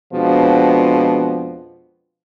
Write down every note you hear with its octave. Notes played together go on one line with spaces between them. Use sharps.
F2 B2 F3 G#3 D4